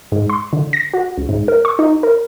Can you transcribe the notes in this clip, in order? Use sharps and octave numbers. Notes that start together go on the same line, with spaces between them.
G#2
C6
D3
A#6
F#4
C#2
G#2
A#4
C#6
D#4
A#4